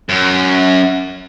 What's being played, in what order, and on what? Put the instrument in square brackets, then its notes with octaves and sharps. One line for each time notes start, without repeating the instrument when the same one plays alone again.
[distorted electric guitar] F#2